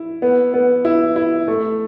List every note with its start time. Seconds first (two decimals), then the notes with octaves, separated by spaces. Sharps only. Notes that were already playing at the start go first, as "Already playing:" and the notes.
Already playing: E4
0.22 B3
0.54 B3
0.85 E4
1.16 E4
1.48 A3